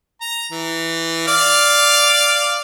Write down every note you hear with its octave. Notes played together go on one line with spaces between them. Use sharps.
A#5
E3
D5 F5 F6